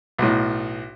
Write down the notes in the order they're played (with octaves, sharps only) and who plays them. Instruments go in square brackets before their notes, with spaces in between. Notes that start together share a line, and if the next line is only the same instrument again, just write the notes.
[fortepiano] B1 A2